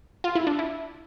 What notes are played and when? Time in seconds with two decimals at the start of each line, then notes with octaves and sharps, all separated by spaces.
0.24 F4
0.35 E4
0.47 D4
0.59 E4